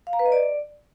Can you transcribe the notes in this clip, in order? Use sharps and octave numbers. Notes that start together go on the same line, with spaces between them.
F5
A#5
B4
D#5
D5